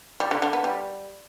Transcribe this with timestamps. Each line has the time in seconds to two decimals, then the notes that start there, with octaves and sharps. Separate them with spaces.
0.20 G3
0.31 D3
0.42 D3
0.53 B3
0.64 G3